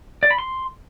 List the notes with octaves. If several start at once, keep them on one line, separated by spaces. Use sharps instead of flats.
D5
B5
C6